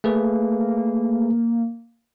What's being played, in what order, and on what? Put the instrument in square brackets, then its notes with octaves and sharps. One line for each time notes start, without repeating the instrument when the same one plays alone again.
[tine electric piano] A3 G#4 B4 [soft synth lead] A#3